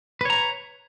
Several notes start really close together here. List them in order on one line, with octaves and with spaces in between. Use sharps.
B4 C#5 A#5